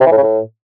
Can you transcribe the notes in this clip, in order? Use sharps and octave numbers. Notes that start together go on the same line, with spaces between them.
C3
E3
A2
C#3
A2